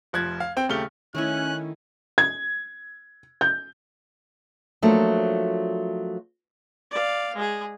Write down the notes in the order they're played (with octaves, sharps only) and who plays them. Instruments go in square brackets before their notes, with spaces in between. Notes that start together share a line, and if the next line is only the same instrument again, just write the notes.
[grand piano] F1 F3 F#6 G#6
F5
C4 G5
D#1 C#3 A3 G4 F6 G7
[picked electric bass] D#3 [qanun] A3 D#4 E4 [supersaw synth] C#4 G#5 [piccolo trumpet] F#6
[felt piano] G#6
G6
[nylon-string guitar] F3 F#3 A3 A#3 D4
[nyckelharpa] D5 F5
G#3 G#4